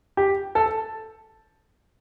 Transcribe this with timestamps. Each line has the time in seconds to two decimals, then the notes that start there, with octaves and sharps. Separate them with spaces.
0.17 G4
0.55 A4